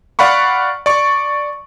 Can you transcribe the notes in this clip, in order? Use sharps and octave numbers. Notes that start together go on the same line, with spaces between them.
D5 F5 F#5 B5 C#6
D5 C#6